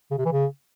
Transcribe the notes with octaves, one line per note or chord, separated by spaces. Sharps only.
C#3
C3
E3
C#3